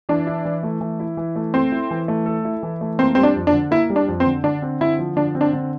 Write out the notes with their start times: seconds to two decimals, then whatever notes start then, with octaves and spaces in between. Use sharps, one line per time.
0.09 E3 D4
0.27 E4
0.45 E3
0.63 A3
0.81 E3
1.00 E4
1.17 E3
1.36 A3
1.54 C4 A4
1.72 E4
1.91 E3
2.08 A3
2.26 A4
2.45 E4
2.63 E3
2.81 A3
2.99 A#3 C4
3.15 G3 C4
3.23 D4
3.36 F2
3.47 D4
3.53 D3
3.71 A#3 E4
3.90 G3
3.96 D4
4.08 F2
4.20 C4
4.26 D3
4.44 D3 D4
4.62 C4
4.81 D3 E4
4.99 F3
5.16 D3 D4
5.35 C4
5.41 D4
5.53 D3